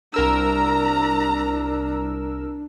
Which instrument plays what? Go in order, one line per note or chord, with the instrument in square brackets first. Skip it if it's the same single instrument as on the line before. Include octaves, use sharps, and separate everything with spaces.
[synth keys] C2 A#4 E6 [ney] D4 [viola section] A#5